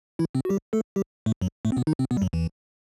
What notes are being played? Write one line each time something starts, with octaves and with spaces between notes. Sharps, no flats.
E3 E4
C3 C4
F#4
G3 G4
A3 A4
G3 G4
A2 A3
F#2 F#3
A2 A3
C4
B2 B3
D#3 D#4
C3 C4
B2 B3
G3
F#2 F#3
E2 E3